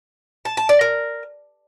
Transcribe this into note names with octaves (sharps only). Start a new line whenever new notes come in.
A5
A5
D5
A#4